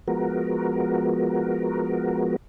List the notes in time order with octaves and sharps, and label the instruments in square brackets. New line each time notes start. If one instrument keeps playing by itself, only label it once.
[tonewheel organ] F3 G#3 B3 F#4 A#4